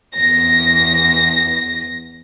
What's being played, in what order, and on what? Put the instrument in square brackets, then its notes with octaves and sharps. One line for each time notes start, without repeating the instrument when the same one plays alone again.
[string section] E2 A#6